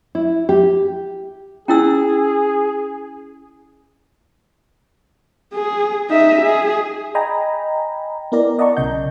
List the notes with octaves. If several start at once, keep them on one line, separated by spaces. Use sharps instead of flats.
E4
G4
C#4 E4 G#4 E6
G#4
D#4 E5
G#4
D#5 G5 G#5 A#5 B5
B3 E4 A#4 D5 A#5
D5 D#5 F#5 A5 A#5 C#6
B1 C#3 D#5 G6